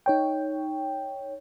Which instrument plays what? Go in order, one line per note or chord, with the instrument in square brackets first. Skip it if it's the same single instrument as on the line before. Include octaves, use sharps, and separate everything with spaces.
[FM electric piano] D#4 C#5 G5